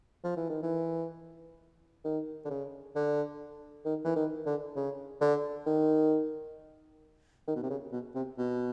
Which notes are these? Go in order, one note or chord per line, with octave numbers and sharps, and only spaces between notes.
F3
E3
D#3
E3
D#3
D3
C#3
D3
D#3
E3
D#3
D3
C#3
D3
D#3
D#3
B2
C3
C#3
B2
C3
B2